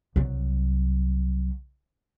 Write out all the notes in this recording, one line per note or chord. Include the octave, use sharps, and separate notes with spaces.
C2 F#3